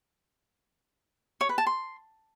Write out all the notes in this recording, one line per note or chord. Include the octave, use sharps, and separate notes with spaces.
C#5
B4
A5
C6